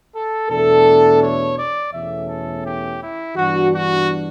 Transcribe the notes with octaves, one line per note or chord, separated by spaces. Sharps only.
A4
E2 B2 A3 D4 A4
C#5
D5
E2 B2 A3 C#4 E5
A4
G4
E4
G2 E3 B3 D4 F#4
F#4